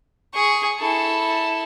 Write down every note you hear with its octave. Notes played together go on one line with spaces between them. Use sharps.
G#4 C#6
E4 A4